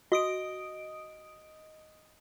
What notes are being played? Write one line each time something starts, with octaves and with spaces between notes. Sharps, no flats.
F#4 D#5 D#6 D7